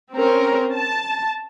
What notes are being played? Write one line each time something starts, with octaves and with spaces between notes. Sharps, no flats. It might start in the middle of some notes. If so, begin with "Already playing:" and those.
C4 C#4 A#4
A5